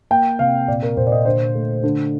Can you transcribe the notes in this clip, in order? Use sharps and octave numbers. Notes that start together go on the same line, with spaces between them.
A#3 G5
C3 F5
A#2 D5
A#4
A#2 C5
D5
D#5
D3 C5
A3
D3